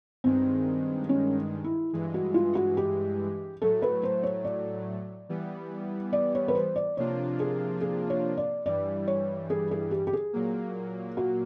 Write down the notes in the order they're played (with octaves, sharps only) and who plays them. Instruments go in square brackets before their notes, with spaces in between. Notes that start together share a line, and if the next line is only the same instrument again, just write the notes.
[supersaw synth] G2 D#3 G#3 [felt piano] C4
[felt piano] C#4
E4
[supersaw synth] G2 E3 G#3
[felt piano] F#4
F4
F#4
G4
[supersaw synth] A2 F#3 A3 [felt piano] A4
[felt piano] B4
C5
C#5
D5
[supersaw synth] E3 G3 B3
[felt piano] D5
C#5
B4
C5
D5
[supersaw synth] C3 F3 A#3 D4 F4 [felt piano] C#5
[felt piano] G#4
G#4
C#5
D5
[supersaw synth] G2 E3 G3 [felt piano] D5
[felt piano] C#5
G#4
G#4
G4
G4
G#4
[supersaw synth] A#2 F#3 A#3
[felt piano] F#4